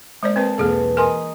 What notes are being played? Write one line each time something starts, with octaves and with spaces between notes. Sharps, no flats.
G#3 A#3 C4 C5 D5
C4 G#4 B4 C5 A5
B1 E2 B2 A#3 G#4 A4
A#4 D#5 G#5 A#5 C6 D#6